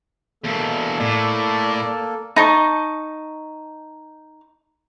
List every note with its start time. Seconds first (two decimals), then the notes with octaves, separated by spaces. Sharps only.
0.44 E2 B2 A#3 A4
1.00 A2 D5
2.36 D#4 A5 C#6